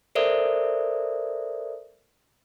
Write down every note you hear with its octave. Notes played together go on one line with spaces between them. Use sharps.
A4 A#4 C5 D5 E5 D#6